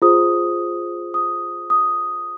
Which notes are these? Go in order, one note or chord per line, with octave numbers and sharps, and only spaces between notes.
F4 G#4 C5 D#6
D#6
D#6